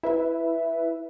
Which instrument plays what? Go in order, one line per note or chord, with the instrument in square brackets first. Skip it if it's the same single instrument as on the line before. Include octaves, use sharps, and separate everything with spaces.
[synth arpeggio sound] E4 B4 E5